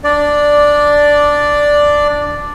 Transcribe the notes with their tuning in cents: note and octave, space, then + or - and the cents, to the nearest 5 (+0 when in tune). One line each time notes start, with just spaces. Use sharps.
D4 -5 D5 +0